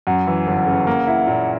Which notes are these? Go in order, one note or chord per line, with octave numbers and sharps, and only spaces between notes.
F#2 F#5
E3
G1
C#3
A#3
E4
A#2